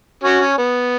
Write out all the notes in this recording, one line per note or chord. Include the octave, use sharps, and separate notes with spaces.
C#4 F#4
C#4
B3